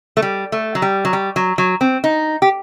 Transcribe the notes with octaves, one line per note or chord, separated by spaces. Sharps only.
A3
G3
A3
F#3
G3
F#3
G3
F#3
F#3
C4
D#4
G4